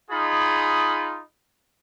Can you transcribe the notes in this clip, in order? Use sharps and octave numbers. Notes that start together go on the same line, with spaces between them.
D#4 F4 G#4 B5